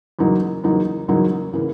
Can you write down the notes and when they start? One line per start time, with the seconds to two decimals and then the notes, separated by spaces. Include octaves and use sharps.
0.19 E2 C#3 F#3 A#3 D#4
0.64 E2 C#3 F#3 A#3 D#4
1.08 E2 C#3 F#3 A#3 D#4
1.53 C#3 E3 A#3